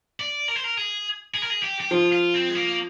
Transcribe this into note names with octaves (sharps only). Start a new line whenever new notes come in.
D5
A#4
C5
A#4
G#4
G#4
A#4
G#4
G4
G4
F3 F4
F4
C4
G#3
A#3